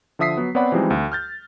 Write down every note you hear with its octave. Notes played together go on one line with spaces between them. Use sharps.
D3 F3 E5 D#6 B6 C7
F#3 B3
B3 C4 C#5 D5 F#5 B5
E3 F3 G3 G#3 C4 D#4
D2
F6 G6 A6